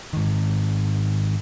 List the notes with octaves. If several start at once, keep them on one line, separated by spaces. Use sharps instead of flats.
G#2 D#3